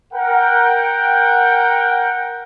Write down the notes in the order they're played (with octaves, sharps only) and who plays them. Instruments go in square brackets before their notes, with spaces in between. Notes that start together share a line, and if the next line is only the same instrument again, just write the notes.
[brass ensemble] A#4 F#5 G5